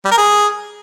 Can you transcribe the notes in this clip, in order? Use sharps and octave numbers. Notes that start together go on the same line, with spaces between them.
G3
A#4
G#4